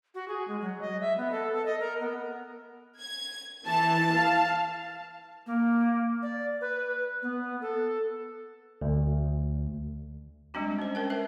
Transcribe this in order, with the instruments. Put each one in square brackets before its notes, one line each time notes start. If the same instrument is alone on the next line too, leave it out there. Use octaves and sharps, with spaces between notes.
[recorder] F#4
G#4
G#3
F#3
D#5
E5
B3
A4
A4
D#5
A#4
B3
[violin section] G#6
[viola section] E3 [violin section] A5
[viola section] F5
[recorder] A#3
D5
B4
B3
A4
[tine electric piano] D2
[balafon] G3 G#3 C4 D4 F#4
C#4 C5
C#4 A#4 G5
A#4 B4 E5